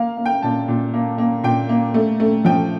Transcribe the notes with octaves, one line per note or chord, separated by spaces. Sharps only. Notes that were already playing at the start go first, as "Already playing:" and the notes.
Already playing: A#3 F5
A#3
G5
A#2 A5
A#2
A#3
A#3
A#2 G5
A#3
A3
A3
F3 G5